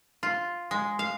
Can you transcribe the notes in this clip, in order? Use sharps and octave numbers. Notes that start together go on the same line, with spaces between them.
F4
G#3
F5